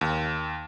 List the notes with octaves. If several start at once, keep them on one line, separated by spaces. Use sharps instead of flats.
D#2